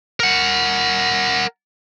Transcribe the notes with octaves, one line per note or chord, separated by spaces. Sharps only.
A#4 F#5